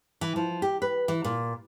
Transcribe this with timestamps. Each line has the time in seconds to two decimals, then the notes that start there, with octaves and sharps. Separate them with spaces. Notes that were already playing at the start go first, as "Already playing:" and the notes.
0.21 E3
0.36 F3
0.62 G4
0.82 B4
1.08 E3
1.24 A#2